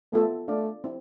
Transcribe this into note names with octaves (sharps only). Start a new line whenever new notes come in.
A3 B3 F4 A4 E5
A3 D4 A4 D5 F5
C4 E4